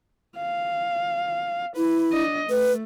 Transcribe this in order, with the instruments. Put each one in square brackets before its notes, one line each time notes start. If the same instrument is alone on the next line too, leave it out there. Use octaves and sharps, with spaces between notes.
[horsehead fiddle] F5
[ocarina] E4 [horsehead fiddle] B4
[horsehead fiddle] D4 D#5
[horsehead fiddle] A3 [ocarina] B4